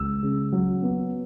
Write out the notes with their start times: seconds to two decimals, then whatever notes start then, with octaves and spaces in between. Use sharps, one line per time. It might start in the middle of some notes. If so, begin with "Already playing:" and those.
Already playing: C#2 E6
0.23 C#3
0.52 F#3
0.82 B3